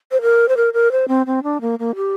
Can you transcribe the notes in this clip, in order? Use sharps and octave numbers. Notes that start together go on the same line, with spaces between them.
C5
A#4
C5
A#4
A#4
C5
C4
C4
D4
A#3
A#3
G4